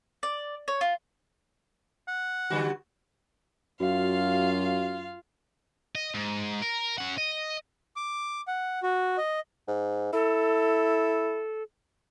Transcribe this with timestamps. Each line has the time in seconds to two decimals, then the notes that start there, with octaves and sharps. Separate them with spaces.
0.23 D5
0.68 C#5
0.81 F4
2.08 F#5
2.50 D3 G3 F#4
3.80 F#2 F4 F#4 F5
5.95 D#5
6.15 G#2
6.62 A#4
6.98 C#4 F#5
7.18 D#5
7.96 D6
8.48 F#5
8.83 F#4
9.18 D#5
9.68 G#2
10.13 E4 A4